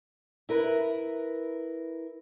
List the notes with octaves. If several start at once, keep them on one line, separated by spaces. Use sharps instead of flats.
E4 A#4 B4